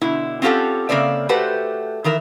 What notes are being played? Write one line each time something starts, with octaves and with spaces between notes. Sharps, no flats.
B2 D3 E4
C4 C#4 F4 G4 A4 F#5
C#3 A#3 C4 D5 E5
A3 F#4 G4 B4 C5 F#5
D#3 E3 A#4 E5